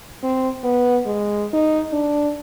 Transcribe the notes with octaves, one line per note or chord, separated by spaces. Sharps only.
C4
B3
G#3
D#4
D4